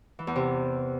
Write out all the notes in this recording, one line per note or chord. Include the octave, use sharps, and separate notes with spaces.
E3
E2
C3